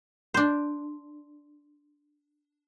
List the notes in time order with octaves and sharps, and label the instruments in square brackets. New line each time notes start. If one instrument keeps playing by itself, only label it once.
[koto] D4 C5